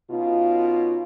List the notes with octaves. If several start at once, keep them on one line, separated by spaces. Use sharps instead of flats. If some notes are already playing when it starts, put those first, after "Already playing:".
B2 C#4 D#4 F4